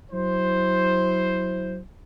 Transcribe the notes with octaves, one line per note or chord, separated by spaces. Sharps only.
F#3 E4 C5